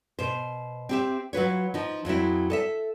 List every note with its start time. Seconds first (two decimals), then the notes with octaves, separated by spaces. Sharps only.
0.19 B2 C5
0.89 C4 G4 E5
1.33 F#3 F4 B4 C#5
1.74 F3 D#4
2.05 F2 F#3 C4 E4
2.50 A4 D#5 E5